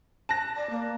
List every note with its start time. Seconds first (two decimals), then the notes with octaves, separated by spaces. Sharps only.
0.29 A5 F#6 A#6
0.57 D5
0.70 A#3